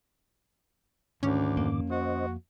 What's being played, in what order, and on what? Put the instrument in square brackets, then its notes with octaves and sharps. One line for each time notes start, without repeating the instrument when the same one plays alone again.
[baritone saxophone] D2 [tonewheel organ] G#2 D#3 D6 [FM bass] C#4
[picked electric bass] F2 A#3
[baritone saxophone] F#4 [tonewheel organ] C5 D#5